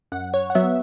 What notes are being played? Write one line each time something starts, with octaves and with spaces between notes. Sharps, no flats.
F#2 F#5
C#5
F#5
F#3 B3 E5